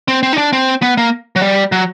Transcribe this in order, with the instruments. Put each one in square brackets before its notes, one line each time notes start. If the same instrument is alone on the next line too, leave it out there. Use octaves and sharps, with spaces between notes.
[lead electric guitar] C4
C4
D#4
D4
C4
B3
A#3
F#3
G3
F#3